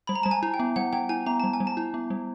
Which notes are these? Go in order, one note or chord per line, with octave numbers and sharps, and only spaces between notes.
G3 B5
A#5
G3 A5
G#5
E4
G5
B3
G3 F#5
G3 G5
E4 G#5
B3 A#5
G3 A5
G#5
G3
A5
E4
B3
G3